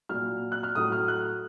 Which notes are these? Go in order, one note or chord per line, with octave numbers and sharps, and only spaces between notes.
A#2 F#3 F6
F#6
F6
A2 F#3 D#6
F6
F#6